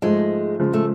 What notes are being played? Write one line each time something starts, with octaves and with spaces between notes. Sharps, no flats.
G#2 F3 G#3 A3
C#3 F3 G#3
A3